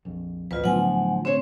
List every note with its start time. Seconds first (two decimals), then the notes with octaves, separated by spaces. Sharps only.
0.05 A#1 F2
0.51 D1 A#1 F2 F4 B4
0.64 A#1 A2 D3 F3 F#3 B3 F#5 G#5
1.25 C4 C5 C#5